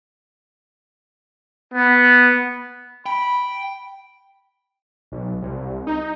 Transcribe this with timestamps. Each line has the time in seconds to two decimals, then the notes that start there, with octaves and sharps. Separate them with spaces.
1.74 B3
3.06 G5 B5
5.12 B1
5.42 C2
5.87 D#4